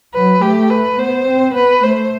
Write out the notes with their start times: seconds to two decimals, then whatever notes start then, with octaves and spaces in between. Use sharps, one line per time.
0.14 F#3 B4
0.42 A3 G4
0.70 B4
0.99 B3 C5
1.27 C4
1.55 B3 B4
1.83 A3 C5